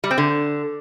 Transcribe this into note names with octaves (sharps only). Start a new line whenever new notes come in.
G3
C4
D3